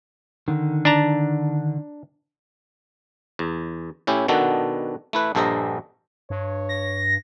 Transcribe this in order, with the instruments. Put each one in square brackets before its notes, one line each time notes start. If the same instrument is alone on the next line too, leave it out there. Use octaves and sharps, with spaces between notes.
[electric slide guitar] D3 D#3
[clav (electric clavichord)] D4 A5 A#5
E2
A2 C#4 E4 G4
B2 D#3 B3 D4 F#4 A4
A3 E4 B4
A#1 G2 A4 C5 D#5 A#5
[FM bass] G2 [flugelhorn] C#5
[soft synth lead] A#6